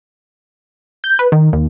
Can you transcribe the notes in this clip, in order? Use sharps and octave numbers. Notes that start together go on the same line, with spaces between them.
G6
B4
D#3
D#2